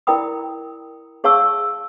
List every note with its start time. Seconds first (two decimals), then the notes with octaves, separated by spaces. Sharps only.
0.07 E4 A#4 D5 G5 B5 D#6
1.24 G#4 C#5 F5 A5 C#6 E6